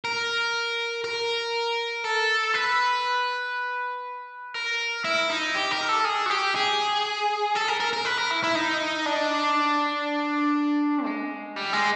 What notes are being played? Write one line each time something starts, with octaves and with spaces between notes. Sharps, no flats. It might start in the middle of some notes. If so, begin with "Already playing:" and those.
A#4
A#4
A4
B4
A#4
E4
D#4
G4
A#4
A4
G#4
F#4
G4
G#4
A4
A#4
A#4
A#4
B4
A#4
E4
E4
D#4
D4
G#3
G3
G#3